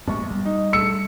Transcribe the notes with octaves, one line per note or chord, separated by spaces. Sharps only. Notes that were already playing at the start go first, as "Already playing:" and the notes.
A#1 G#3 A#3 B3 C#6
G3
D#4
A3 E6 C#7